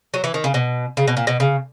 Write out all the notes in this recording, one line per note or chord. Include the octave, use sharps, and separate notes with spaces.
F#3
E3
D#3
C#3
B2
C#3
B2
A#2
B2
C#3